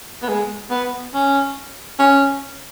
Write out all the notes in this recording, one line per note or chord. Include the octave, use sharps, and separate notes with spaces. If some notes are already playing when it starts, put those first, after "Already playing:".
B3
G#3
B3
C#4
C#4